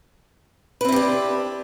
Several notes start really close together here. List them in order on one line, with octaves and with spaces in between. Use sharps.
B4 C4 E4 G4 D4